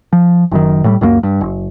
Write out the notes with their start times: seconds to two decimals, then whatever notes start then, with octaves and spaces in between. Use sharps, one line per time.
0.13 F3
0.51 F#1 F#2 D#3
0.84 A2 F#3 G3
1.01 C#2 F#2 G3 A#3
1.23 G2
1.41 F#1